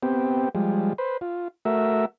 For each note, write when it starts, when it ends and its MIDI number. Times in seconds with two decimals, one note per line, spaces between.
0.03 0.49 59
0.03 0.49 60
0.03 0.49 67
0.55 0.93 53
0.55 0.93 55
0.55 0.93 56
0.98 1.17 71
0.98 1.17 72
1.21 1.48 65
1.65 2.05 57
1.65 2.05 66
1.65 2.05 70
1.65 2.05 76